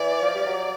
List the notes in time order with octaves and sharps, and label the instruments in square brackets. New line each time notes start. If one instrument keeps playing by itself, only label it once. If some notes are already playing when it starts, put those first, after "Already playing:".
Already playing: [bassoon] E3 [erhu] D5
[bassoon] F3
G3
F#3